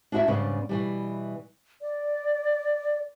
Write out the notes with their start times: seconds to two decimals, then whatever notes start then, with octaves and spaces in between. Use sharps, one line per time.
0.12 D4 E4 F#4 D#5 E5
0.27 G#2 C#3 G3 B3 D4
0.69 B2 E3 G3
1.82 D5